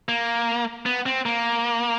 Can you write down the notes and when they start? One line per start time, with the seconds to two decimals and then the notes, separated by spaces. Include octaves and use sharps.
0.09 A#3
0.86 B3
1.06 C4
1.26 A#3